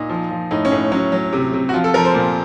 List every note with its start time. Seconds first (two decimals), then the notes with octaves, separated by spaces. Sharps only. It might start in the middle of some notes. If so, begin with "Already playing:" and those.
Already playing: A#2 D#4
0.09 F3
0.30 F3
0.51 A2 D#4
0.65 C#4
0.72 A2
0.92 F#3 C#4
1.12 F#3
1.33 C3
1.54 C3
1.69 F#4
1.74 F3 F4
1.84 A4
1.94 F3 A#4
2.05 C5
2.15 A#2